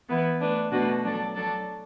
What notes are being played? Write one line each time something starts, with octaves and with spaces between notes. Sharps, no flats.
E3 B3 E4 B4
A3 D4 B4
B2 A3 D4 F#4 B4
F#3 D4 A4
F#3 D4 A4